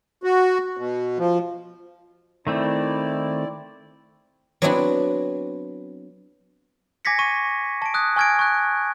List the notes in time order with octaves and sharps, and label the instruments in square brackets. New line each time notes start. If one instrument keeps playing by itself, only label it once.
[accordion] F#4
B2
F3
[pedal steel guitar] D#3 A3 C4 [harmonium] E4 D5
[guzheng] F#3 B3 C4 D4 E4 F#4
[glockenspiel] G#5 D6 G#6 A#6 B6 C#7
C#6 D#7
A5 D7
D#6 F#6 G#6
G#5 C#6 F6 G#6 A#6 D7
C#6 F#6